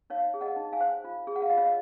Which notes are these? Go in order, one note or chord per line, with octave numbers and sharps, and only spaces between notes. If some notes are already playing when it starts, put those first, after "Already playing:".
D#4 C#5 F5
G#4
D#5 F#5
D#4
F5 G#5
C5
F4
G#4
F#5
F5
F4 D#5
C#5 F5
D#5